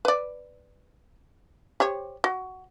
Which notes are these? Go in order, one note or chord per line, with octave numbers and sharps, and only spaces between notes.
B4 D5
G4 C5 C#5
F#4